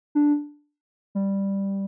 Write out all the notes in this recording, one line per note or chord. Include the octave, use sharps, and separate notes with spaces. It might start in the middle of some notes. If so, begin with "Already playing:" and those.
D4
G3